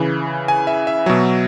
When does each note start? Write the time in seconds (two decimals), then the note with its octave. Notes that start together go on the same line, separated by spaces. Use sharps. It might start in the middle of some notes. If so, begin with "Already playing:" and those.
Already playing: C#3 E3
0.48 G#5
0.67 E5
0.87 E5
1.06 B2 F#3